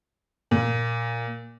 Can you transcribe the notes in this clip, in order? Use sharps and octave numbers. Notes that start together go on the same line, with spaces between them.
A#2